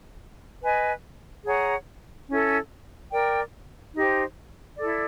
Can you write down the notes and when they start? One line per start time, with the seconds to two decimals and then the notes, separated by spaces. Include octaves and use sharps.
0.63 B4 D#5 G#5
1.46 G#4 C#5 F#5 A#5
2.28 C#4 E4 A4
3.12 A#4 D5 G5
3.94 D#4 G4 C5
4.77 E4 A4 D5